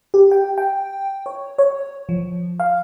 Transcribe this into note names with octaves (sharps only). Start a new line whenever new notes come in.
G4
G5
G5
C#5
C#5
F3
F5